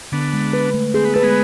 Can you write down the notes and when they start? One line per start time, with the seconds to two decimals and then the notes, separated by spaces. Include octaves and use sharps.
0.12 D3 B3 D4
0.33 G#3
0.53 B4
0.74 A3
0.94 C4 G#4
1.05 B3
1.14 A3 B4
1.23 G#3 B3